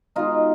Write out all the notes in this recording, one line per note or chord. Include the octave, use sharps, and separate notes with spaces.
B2 G#3 D#4 F4